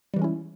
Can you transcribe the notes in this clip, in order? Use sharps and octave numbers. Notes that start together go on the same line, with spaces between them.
E3 G3 G#3 C#4 E4